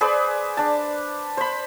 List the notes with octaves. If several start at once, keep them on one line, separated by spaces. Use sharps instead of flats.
G#4 B4 C5 D5
D4 A5
C5 B5